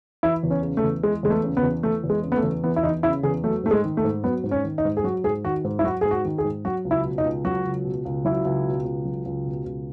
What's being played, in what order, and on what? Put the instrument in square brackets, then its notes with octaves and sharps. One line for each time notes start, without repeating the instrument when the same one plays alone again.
[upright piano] E3 E4
E2
C#4
C#3
A3
E2
E3 G#3
E2 G#3
A3
C#3
B3
E2
E3 A3
E2
G#3
C#3
B3
A3
E2
E3 B3
E4
E2 D#4
C#3 E4
E2 G#4
F#3 A3
G#2 A3
G#3
D#3
A3
G#2
F#3 B3
G#2
C#4
D#3
D#4
G#2
G#4
F#3 F#4
G#2 G#4
D#3 F#4
G#2
E4
F#3 F#4
G#2 G#4
F#4
D#3
G#4
G#2
F#3 F#4
C#2
E4
B2
D#4
C#2
F#3 F#4
C#2
B2
C#2
F#3 E4
C#2
B2
C#2
F#3
C#2
B2
C#2